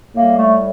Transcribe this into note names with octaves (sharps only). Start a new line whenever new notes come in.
A2 G3 A#3
A3